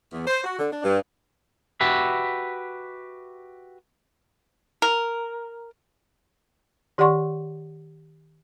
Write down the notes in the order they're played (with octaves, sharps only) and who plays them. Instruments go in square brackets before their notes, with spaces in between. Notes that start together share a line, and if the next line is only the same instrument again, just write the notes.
[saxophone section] E2
C5
F#4
D3
D4
G2
[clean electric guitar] F#4 G4 B4 E5
[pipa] A#4
[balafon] D#3 G4 D5 F#5 C6 C#6